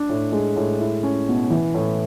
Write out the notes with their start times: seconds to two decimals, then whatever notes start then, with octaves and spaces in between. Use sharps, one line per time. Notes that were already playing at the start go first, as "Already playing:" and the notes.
Already playing: D4
0.09 A2
0.32 G#3
0.56 A2
0.80 E4
1.03 C#4
1.28 B2
1.50 E3
1.74 A2